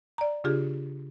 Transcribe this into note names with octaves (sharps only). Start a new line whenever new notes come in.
D5 A#5
C#3 D4 F4 G4 G#4